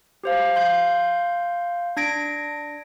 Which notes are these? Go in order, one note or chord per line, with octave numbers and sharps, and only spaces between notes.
G4 C5 F5
F5 C6 G6
D4 G#6 A#6 D7